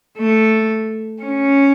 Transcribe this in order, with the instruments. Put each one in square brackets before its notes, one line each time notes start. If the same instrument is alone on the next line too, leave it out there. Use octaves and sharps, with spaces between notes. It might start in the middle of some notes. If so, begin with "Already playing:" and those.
[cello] A3
C#4